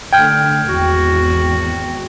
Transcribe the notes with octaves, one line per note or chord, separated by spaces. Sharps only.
D3 A3 G5 F6 G6 G#6
G#1 E2 F#4